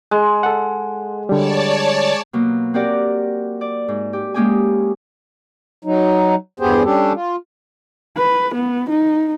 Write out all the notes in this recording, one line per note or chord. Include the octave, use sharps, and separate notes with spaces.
G#3
A4 F#5
D3 G3 C#5 D5 A5
B2 F#3 A#3
C4 F#4 G4 A#4 D5 F#5
D5
G#2
G4
G#3 A#3 C#4 G4 G#4 G#5
F#3 D#4
E2 G2 B3 G4 G#4 C5
G3 C#4 D4 G4 A4
F4
B4
B3
D#4